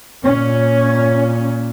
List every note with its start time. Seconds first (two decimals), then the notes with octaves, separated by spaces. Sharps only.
0.23 A#2 C#4